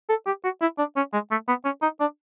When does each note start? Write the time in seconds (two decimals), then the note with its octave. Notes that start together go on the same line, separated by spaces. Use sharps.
0.09 A4
0.27 G4
0.44 F#4
0.61 E4
0.78 D4
0.97 C#4
1.13 G#3
1.31 A3
1.48 B3
1.65 C#4
1.82 D#4
2.00 D4